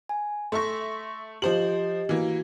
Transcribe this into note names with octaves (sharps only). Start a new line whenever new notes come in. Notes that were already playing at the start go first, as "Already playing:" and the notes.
G#5
A3 E5 C6 C#6 A#6
F3 G4 C5 D#5 F#7
E3 A#3 F#4